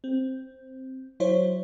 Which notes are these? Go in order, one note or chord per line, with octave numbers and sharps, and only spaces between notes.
C4
F#3 E4 C5 C#5